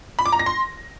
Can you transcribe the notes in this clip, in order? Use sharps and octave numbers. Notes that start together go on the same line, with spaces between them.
B5
D6
A#5
A#6
C6